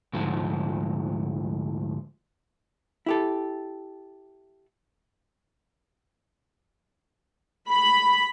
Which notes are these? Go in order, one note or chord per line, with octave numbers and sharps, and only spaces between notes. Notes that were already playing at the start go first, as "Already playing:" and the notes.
D2 G#2 F3
E4 G4 A4
B5